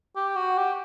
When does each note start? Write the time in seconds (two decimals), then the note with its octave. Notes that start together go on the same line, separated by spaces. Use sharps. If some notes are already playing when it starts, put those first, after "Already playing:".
0.16 G4
0.36 F#4
0.58 G4